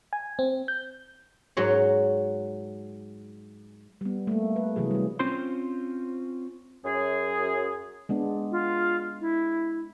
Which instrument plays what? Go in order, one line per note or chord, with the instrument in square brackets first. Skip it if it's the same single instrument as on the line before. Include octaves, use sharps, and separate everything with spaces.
[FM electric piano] G#5
C4
G6
[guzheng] G#2 F#3 C#5
[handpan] G3 B3
A3 A#3
B4
C3 E3 F#3 G#4
G3 A3
[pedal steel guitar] C4 C#4 F4 C5 C6
[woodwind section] F#2 G#4
[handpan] G#3 B3 D4
[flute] F4
E4